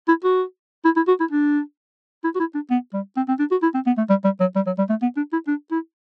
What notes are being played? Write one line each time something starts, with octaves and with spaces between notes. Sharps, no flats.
E4
F#4
E4
E4
F#4
E4
D4
E4
F#4
E4
D4
B3
G3
C4
C4
D4
F#4
E4
C4
B3
A3
G3
G3
F#3
G3
F#3
G3
A3
B3
D4
E4
D4
E4